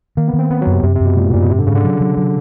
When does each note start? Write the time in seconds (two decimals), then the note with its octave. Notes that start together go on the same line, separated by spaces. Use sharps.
0.17 D#3 A#3
0.28 B3
0.33 D#3
0.39 C4
0.50 B3 C4
0.61 F#3
0.67 F#2
0.73 C3
0.83 F#2 C3
0.95 C3
1.00 F#2
1.06 B2
1.16 A#2 G#3
1.25 A2
1.34 F#2 A#2
1.42 B2
1.50 G#2 C3
1.59 D3
1.67 G#2 C#3
1.75 D3
1.84 F#3
2.01 F#3
2.17 F#3